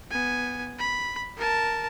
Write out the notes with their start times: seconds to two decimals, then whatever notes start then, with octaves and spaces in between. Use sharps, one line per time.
0.11 B3 G#5
0.79 B5
1.37 A#4 A5